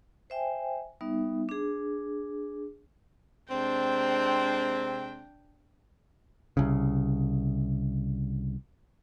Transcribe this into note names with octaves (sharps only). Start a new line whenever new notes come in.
C5 E5 G5 G#5
G3 B3 D#4 E5
D4 G#4
C3 G#3 C4 D4 G5
C2 C#3